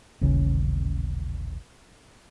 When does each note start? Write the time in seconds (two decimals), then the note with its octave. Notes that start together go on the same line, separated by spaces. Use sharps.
0.21 D#1 A1 A2 C#3